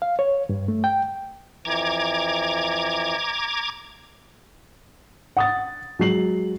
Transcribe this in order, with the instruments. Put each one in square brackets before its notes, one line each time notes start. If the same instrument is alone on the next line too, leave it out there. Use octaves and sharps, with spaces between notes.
[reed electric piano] F5
C#5
G2
A3
G5
[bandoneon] F2 E3 [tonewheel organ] A#5 D6 G#6
[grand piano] F#5 D#6 A6
F#3 G#3 C7 F#7